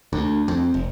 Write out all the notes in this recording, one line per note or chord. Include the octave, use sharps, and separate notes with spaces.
D2
F2
F1